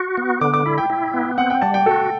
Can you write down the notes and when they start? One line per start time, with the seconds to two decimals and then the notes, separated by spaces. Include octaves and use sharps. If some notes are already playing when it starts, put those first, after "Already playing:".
Already playing: F#4
0.17 B3
0.41 D3 D6
0.54 D6
0.66 E4 B5
0.78 G5
0.90 E4
1.14 B3
1.38 C4 F#5
1.50 G5
1.62 G3 A5
1.74 G5
1.86 F#4 A4